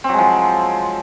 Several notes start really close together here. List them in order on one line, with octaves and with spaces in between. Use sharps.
C4 F#3 G#3 F3